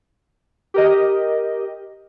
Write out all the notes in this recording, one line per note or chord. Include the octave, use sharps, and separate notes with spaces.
G4 A#4 D#5